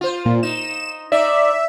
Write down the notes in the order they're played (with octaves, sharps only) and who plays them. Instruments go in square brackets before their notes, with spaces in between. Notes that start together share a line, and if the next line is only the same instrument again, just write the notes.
[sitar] F4 C5
[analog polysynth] A#2
[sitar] D#4 [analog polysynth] E7
[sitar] D#4 D5 [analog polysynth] E5